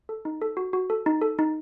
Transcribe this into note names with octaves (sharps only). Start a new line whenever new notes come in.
A4
D#4
A4
F#4
F#4
A4
D#4
A4
D#4